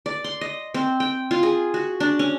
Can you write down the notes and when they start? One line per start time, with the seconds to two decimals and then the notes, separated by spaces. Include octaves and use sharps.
0.06 D5
0.24 C6
0.41 D#5
0.74 C4
1.00 G5
1.31 F4
1.43 G#4
1.74 F#4
2.00 D4
2.19 C#4